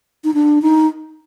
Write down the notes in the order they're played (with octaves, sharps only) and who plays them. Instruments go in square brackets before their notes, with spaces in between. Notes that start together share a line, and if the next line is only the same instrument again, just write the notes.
[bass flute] D#4
D4
D#4